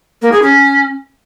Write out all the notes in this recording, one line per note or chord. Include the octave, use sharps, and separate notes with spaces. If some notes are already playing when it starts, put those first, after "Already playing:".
A#3
G#4
C#4